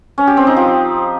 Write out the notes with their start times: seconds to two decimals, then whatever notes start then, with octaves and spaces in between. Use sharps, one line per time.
0.18 C#4
0.27 G4
0.37 C4
0.47 D#4
0.57 F3